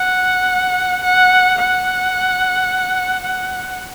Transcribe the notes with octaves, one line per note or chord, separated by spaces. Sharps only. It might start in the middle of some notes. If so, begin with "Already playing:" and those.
Already playing: F#5
F#5
F#5
F#5